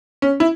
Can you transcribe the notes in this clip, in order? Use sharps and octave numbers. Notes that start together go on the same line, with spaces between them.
C#4
E4